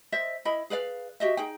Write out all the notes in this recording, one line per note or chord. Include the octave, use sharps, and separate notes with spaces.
C5 D#5 E5
E4 D#5 B5
G#4 B4 D5 F5
F#4 G4 D#5 E5
D#4 G#4 G5